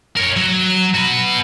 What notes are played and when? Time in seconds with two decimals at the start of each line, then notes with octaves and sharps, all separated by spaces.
0.16 A#4 C#5
0.36 F#3
0.94 F#4 B4